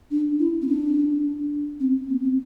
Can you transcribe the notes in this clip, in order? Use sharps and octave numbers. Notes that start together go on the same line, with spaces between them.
D4
E4
C4
D4
C4
B3
C4